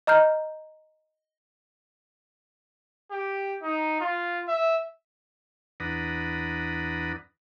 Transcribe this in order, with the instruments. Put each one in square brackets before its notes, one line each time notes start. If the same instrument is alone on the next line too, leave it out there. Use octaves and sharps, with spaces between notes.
[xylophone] D#5 A#5 F6 G6
[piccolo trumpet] G4
D#4
F4
E5
[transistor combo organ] E2 D4 B4 F#5 A#5 D#6